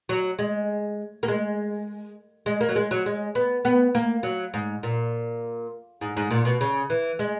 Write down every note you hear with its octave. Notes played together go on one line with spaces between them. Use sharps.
F#3
G#3
A#3
G#3
G#3
A#3
F#3
G#3
F#3
G#3
B3
B3
A#3
F#3
G#2
A#2
G#2
G#2
A#2
B2
C#3
E3
G#3